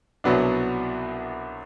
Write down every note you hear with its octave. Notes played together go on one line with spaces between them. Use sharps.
C2 B2 F#3 B3 D4